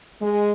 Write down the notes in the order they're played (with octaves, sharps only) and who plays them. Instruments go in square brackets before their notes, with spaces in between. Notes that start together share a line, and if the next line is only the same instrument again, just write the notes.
[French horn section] G#3